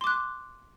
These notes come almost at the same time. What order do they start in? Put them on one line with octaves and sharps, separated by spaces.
C6 D6 F#6